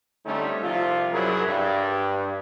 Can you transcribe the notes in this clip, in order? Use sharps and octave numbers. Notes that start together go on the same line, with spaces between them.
D3 G3 A3 C4 C#4 D#4
C2 C3 F3 F4
C2 F#2 F#3 E4 G#4 A#4
G2